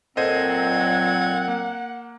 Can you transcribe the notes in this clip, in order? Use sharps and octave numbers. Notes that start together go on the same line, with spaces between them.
A#2 F#3 C4 A4 C5 D#5 F#5 G#6
A#3